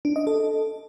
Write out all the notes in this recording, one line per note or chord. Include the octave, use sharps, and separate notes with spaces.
D4
D#5
A4